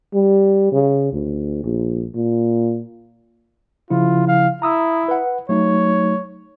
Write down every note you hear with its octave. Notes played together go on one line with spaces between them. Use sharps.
G3
C#3
D2
A#1
A#2
C#3 F3 E4 F4
F5
E4 A#5 D#6 E6
B4 F#5
F#3 A3 D#4 C#5